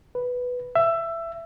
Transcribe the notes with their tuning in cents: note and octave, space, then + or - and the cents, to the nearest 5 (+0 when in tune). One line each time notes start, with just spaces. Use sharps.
B4 +0
E5 +15